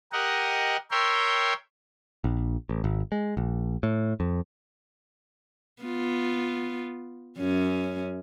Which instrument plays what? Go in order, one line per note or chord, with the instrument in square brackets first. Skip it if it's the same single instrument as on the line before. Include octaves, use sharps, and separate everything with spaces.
[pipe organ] G4 A#4 D#5 F#5
A#4 C#5 E5 G5 C6
[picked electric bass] A#1
A1
G#1
G#3
A#1
A2
F2
[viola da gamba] B3 F4
F#2 C#4